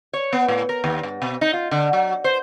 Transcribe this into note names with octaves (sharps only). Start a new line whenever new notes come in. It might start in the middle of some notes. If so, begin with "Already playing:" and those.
C#5
B3
A2
A#4
D#2
G2
B2
D#4
F4
D3
F#3
C5